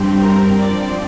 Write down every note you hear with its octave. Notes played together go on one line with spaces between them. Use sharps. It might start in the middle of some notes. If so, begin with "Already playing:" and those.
Already playing: G2 G3 C4
A#4
G2 F3 C4 D5